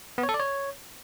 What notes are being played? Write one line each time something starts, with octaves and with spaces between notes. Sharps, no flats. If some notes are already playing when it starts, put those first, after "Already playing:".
B3
C#5
A4
D5
C#5